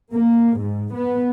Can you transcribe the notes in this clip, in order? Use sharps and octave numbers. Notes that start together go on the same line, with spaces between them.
A#3
G#2
B3